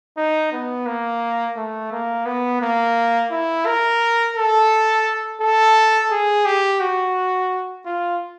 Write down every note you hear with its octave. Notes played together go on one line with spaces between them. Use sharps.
D#4
B3
A#3
A3
A#3
B3
A#3
E4
A#4
A4
A4
G#4
G4
F#4
F4